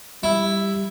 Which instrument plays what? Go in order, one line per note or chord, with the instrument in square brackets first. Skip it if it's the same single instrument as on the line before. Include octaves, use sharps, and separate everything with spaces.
[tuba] G3 [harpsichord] E4